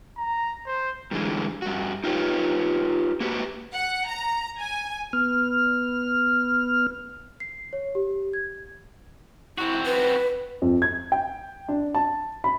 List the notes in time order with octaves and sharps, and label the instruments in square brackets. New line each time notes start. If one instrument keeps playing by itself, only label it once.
[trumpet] A#5
C5
[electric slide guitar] G2 D3 E3 G#3
G2 F#4
D#4 F4 G4 B4 C#5
A#3 F#4 G4 B4
[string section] F#5
A#5
G#5
[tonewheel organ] B3 F6
[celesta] C7
C#5
G4
G#6
[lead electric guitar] C4 F#4 [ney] E4
[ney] B4
[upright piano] F2
G#6
G5
D4
A5
B5